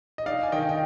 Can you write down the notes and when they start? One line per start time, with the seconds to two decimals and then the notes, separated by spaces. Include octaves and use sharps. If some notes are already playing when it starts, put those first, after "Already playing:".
0.18 D#5
0.26 D#4 D5 F5
0.43 G#5
0.52 D#3 D#5 G5
0.69 G5